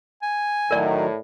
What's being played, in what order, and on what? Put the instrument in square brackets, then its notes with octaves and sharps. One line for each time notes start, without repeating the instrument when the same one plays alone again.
[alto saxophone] G#5
[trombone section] A2 [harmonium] D#3 F#3 [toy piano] A#4 D5